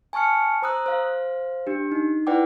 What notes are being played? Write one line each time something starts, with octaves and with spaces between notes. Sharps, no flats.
G#5 A5 C#6 F6 C#7
C5 A#5 D#6 E6 F#6
C5 F5
D4 G4
D#4
E4 B4 D5 F#5 G5 D6